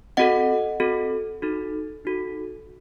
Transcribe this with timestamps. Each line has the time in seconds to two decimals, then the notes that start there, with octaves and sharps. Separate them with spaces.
0.17 C4 F#4 A4 D#5 F#5
0.80 C4 F#4 A4
1.42 D#4 F#4 A4
2.05 D#4 F#4 A4